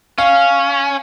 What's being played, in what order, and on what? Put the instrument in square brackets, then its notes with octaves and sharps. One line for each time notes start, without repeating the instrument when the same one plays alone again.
[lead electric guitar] C#4 [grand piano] F5